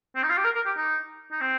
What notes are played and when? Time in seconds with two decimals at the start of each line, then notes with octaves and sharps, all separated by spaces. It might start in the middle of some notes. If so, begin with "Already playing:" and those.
0.15 C4
0.23 D#4
0.30 F4
0.37 G4
0.44 A#4
0.55 A#4
0.66 G4
0.77 D#4
1.32 D#4
1.41 C4